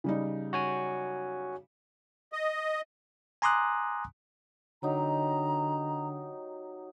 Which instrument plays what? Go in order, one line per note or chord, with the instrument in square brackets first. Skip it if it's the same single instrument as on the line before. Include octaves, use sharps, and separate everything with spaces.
[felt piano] C#3 G3 D#4
[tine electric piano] F#4 C#5 G#5
[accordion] D#5
[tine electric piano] G#5 A#5 C6 D6 D#6 F#6
[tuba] D3 [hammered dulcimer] F#3 D#4 G4 [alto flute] A#5